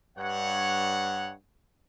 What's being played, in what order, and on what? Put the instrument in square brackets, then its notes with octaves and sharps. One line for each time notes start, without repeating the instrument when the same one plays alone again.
[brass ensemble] G2 C#5 F#5